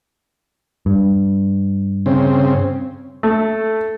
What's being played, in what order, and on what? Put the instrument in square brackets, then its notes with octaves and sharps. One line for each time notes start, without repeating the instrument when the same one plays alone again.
[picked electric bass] G2
[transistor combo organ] C#3 C4
[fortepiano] A3